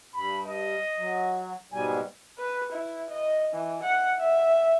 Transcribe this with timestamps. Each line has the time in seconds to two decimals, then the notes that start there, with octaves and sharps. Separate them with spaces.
0.14 G2 B5
0.45 D#5
0.97 F#3
1.72 G#2 B2 G3 G#5
2.38 B4
2.72 E4
3.10 D#5
3.53 E3
3.83 F#5
4.20 E5